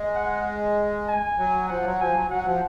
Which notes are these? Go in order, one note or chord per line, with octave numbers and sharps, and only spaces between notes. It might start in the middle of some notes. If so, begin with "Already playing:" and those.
Already playing: G#3
F#5
G#5
F#3
F3 F#5
F#3
F3 G#5
F#3
F#3 F#5
F3